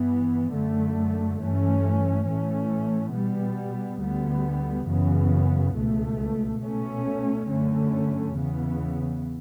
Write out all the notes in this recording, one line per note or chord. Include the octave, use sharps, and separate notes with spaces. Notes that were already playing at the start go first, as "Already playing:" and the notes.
Already playing: G2 E3 B3
F#2 D3 A3
G2 E3 A3 C#4
A2 E3 A3 C#4
B2 G3 B3
D2 D3 G3 B3
F#2 C#3 E3 B3
C#2 B2 A3
B2 A3 C#4
F#2 D3 A3 C#4
E2 C#3 E3 B3